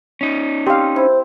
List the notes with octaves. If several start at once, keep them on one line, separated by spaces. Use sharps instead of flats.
C#4 D#4
C4 G4 F5
E4 C5